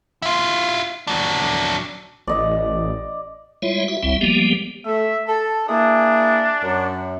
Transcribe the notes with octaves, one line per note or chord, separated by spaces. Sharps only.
E4 F4
F#3 D4
A1 D5 D#5
G3 G#3 E4 F4 C#5 E5
E4 F#4 E5
F#1 C#2 G3 C4 E4 E5
F3 G3 G#3 A#3 B3 G4
A3 E5
A4 A5
A#3 D4 E4 G#4
F#2